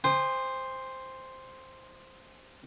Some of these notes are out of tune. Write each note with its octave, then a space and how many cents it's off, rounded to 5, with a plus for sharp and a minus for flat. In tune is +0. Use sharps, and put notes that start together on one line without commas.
C5 +0 G5 +45 D#6 -30